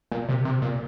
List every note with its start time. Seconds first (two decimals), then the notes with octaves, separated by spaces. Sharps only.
0.12 A#2
0.29 C3
0.45 C3
0.62 A#2